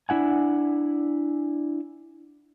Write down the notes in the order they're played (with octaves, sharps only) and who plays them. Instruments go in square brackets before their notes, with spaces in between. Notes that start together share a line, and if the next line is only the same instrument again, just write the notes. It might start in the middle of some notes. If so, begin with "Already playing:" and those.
[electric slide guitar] D4 E4 F#5 G#5